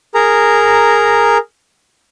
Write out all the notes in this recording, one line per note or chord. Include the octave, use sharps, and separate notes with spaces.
G#4 A#4 A#5